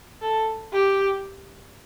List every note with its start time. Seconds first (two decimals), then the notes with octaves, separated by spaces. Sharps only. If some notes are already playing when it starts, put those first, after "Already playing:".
0.22 A4
0.73 G4